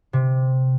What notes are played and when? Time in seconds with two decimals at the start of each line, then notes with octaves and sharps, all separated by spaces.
0.13 C3